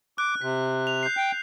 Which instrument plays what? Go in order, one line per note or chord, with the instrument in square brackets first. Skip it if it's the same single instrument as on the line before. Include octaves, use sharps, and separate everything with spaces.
[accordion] D6 [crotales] F#6
[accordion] C3 [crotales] B6
[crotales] F7
G6 C7
[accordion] G5